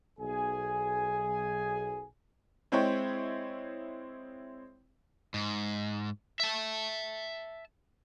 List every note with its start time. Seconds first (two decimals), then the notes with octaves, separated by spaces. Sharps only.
0.19 B1 G#4 G#5
2.72 G#3 C4 E4 C#5 G5
5.34 G#2
6.40 E5 A5